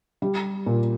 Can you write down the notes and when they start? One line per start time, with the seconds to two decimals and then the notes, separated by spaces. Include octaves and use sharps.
0.22 G3
0.66 A#2